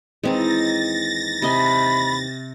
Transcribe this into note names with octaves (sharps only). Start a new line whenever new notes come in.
D#2 E3 G#3 C4 D#4 G#4 A6 A#6
C3 D#5 G#5 B5